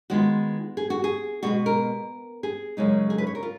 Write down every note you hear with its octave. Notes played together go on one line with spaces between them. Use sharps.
D#3 G#3 B3 F4 F#4
G#4
F#4
G#4
B2 G#3 B3 F#4
A#4
G#4
F#2 C#3 G#3 D#4
G#4
B4
C#5
A#4
F4